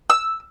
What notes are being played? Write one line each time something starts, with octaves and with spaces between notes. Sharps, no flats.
E6